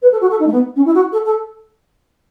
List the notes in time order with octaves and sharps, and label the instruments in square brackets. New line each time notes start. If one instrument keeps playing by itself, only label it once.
[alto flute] B4
A4
F#4
A4
D#4
A3
B3
C#4
E4
F#4
A4
A4